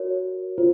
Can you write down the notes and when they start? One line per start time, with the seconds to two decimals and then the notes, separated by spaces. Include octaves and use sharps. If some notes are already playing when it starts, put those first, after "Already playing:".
Already playing: F#4 A#4 C#5
0.58 F4 C5